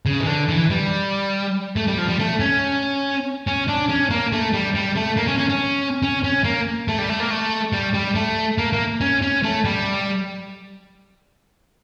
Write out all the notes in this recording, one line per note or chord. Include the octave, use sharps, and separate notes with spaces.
C#3
E3
D3
E3
G3
A3
G3
F3
G3
A3
C#4
C#4
D4
C#4
A#3
A3
G3
G3
A3
A#3
C#4
C#4
C#4
C#4
C#4
A#3
A3
G3
A3
A#3
A3
G3
G3
A3
A#3
A#3
C#4
C#4
A3
G3